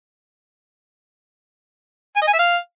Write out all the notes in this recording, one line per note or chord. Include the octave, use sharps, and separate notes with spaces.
G#5
D#5
G#5
E5
F5